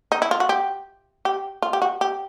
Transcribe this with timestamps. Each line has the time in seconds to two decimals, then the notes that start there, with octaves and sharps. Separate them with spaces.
0.12 D#4
0.22 E4
0.31 F4
0.40 F#4
0.49 G4
1.25 G4
1.62 F4
1.73 G4
1.82 F#4
2.01 G4